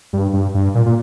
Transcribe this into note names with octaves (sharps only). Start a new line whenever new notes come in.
G2
G2
G2
A#2
A#2